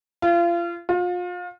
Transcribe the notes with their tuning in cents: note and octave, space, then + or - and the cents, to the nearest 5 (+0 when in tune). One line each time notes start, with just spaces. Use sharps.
F4 -30
F4 +35